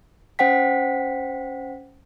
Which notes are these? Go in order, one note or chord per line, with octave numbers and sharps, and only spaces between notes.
C#4 C5 F#5 G5 B6